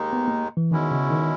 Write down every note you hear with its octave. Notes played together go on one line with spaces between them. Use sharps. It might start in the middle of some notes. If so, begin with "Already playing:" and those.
Already playing: D#2 D#3 G#3 D#4
B3
A#3
E3
E2 B2 D#3 G#3 C#4 E4
C#3
D#3